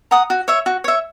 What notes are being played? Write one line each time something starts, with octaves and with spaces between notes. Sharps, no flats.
F#5 A#5 D#6
F#4
C#5 E5
F#4
C#5 E5